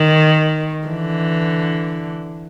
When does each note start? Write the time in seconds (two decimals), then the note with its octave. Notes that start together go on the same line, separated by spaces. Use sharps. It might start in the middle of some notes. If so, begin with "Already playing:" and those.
Already playing: D#3
0.87 D3 E3